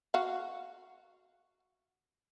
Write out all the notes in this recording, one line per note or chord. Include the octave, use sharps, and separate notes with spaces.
F#4 F5